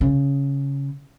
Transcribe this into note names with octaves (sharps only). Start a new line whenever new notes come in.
C#3